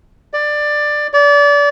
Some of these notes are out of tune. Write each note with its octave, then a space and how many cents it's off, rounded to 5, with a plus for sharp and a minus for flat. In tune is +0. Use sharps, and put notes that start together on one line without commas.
D5 +15
D5 -30